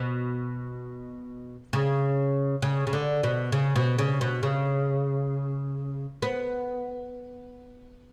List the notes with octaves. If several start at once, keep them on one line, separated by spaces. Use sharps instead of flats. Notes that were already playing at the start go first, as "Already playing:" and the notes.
Already playing: B2
C#3
C#3
C#3
D3
B2
C#3
B2
C#3
B2
C#3
B3